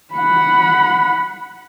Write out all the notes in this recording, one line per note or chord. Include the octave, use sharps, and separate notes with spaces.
F#5 B5